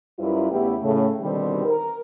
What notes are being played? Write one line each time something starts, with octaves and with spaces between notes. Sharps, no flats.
F#2 G3 E4 F4 A#4 B4
E2 C#3 A3 B3 E4 G4
A2 C#3 A3
B2 D3 D#3 G3 C4 G4
A#4